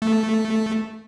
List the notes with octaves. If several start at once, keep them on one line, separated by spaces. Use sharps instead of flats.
A3